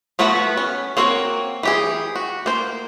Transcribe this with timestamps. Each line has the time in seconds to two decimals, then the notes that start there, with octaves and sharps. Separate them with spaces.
0.19 F3 A3 B3 F#4 B4
0.57 C#4
0.97 A#3 C4 F#4 A#4 C#5
1.63 E3 G4 G#4
2.16 F#4
2.46 A#3 C5